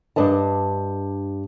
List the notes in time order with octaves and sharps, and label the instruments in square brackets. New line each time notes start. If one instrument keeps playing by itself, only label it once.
[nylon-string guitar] G2 D4 B4 D#5 A5